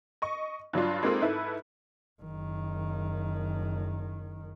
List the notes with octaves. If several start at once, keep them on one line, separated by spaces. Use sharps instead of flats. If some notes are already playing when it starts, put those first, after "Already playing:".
D#5 C#6
G2 F#3 D4 F4
G#3 A#3 C4 D#4 F4 A4
G#2 E4 A4 B4
F#1 D#3